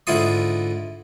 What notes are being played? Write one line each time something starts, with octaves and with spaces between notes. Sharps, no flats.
G#2 D3 E4 F4 F5 D#6